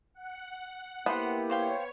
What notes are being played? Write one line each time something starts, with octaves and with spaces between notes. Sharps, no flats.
F#5
A#3 B3 E4 G4 C5
C5 C#5 F5 G5